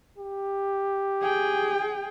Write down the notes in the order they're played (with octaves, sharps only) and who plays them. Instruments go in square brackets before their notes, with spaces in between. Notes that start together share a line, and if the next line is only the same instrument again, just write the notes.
[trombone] G4
[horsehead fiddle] G#4 G5